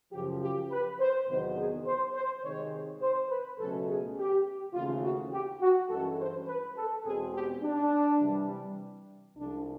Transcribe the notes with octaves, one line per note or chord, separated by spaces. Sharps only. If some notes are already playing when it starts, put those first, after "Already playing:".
F#2 C#3 F3 G4
G4
B4
C5
E2 C3 D#3 F#3 B3 C5
G#4
C5
C5
C3 D#3 G#3 C4 C#5
C5
B4
C#2 B2 F#3 A3 C#4 A4
G#4
G4
D#2 C#3 E3 A3 C4 F4
F#4
G4
F#4
G2 E3 G#3 C#4 A4
C5
B4
A4
E2 B2 G#3 C4 G#4
G4
D4
C3 E3 G3
C2 C3 F3 G#3 D4